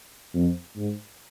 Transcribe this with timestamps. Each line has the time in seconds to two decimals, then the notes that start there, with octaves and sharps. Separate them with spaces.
0.34 F2
0.76 G#2